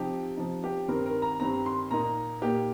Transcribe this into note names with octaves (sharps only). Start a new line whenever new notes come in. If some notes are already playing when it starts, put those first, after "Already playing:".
Already playing: C3 F3 D#4 G4
C3 F3 D#4
G4
G2 D#3 C4 A#4
A#4
A#5
G2 D#3 C4 A#5
C6
A#2 A#3 D#4 A#5
A#2 A#3 D#4 G4